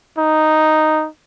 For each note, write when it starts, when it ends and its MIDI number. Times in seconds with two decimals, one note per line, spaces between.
0.18 1.08 63